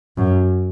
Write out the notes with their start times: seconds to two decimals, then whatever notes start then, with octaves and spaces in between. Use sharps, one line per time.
0.17 F#2